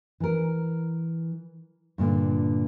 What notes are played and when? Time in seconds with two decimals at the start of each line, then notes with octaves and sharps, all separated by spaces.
0.20 E3 A#4
1.98 G2 A#2 D3